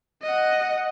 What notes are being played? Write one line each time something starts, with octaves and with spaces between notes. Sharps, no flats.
D#5 F#5